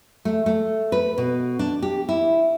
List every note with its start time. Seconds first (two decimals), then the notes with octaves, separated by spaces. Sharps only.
0.25 A3
0.46 A3
0.92 B4
1.18 B2
1.59 D4
1.82 G4
2.09 E4